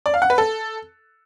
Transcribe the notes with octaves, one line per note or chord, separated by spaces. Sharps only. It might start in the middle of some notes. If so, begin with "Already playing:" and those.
D5
F5
F#5
B4
A4